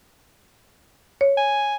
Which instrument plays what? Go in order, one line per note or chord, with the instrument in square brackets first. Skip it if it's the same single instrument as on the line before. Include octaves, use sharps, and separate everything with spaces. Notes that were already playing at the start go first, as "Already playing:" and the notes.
[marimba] C#5
[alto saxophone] G#5